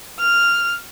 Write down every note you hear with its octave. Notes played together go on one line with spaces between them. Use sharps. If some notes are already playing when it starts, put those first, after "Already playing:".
F6